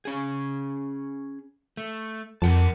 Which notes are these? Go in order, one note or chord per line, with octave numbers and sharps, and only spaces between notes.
C#4 G#4
A3
F2 A#4 F#5 A5